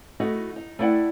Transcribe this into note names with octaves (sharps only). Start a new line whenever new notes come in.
A3 D#4 E4 F#4 D#5
D#4
A3 B3 E4 D5 F#5 G5